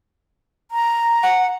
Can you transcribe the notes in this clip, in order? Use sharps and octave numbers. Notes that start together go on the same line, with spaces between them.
A#5
F#5